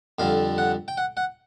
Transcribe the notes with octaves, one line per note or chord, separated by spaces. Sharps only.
F2 D3 G3 F5
F#5
G5
F#5
F#5